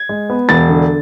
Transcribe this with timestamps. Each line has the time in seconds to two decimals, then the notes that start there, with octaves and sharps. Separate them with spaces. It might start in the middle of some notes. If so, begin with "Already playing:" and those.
Already playing: G#6
0.09 G#3
0.30 B3
0.49 E1 A6
0.69 D3